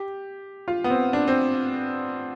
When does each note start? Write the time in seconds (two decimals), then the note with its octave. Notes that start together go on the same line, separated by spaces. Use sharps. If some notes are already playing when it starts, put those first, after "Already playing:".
Already playing: G4
0.68 F4
0.84 B3
0.90 C4
1.13 D4
1.28 C4